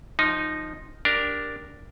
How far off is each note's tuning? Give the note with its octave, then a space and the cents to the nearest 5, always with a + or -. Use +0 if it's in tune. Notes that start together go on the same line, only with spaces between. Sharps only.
F3 +0 D#4 -5
D4 +0 G4 +0 A#4 +0